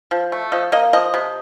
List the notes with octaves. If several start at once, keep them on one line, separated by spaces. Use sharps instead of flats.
F3
A3
F3 D#5
A#3 D#5
F3 D#5
C3